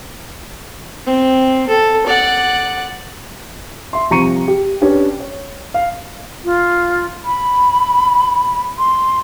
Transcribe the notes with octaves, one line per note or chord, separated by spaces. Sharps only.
C4
A4
D5 F#5
E5 C6
C2 F3 A#5 C#6 C#7 D#7
G4
C#4 D4 G4 B4
C#5
F5
F4
B5
C6